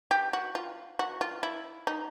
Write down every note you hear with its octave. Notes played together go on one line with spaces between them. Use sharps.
G4
F#4
F4
F#4
F4
E4
D#4